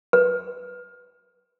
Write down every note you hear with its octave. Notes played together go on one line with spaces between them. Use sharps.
B4